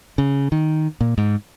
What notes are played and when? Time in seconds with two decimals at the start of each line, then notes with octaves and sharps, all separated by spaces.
0.18 C#3
0.52 D#3
1.01 A#2
1.18 G#2